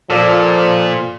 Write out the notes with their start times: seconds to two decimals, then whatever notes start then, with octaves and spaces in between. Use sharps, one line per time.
0.10 A#2 F3 A4 D5